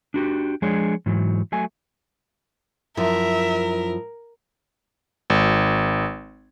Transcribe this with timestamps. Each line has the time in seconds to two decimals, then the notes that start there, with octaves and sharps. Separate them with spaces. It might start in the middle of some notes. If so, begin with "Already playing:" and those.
0.14 D4 F#4 G4
0.62 F3 G#3 D4 G#4 C#5
1.06 G#2 E3 F#3
1.52 F#3 A3 G#5
2.97 F#2 F3 E4 A#4 E5
5.30 G#1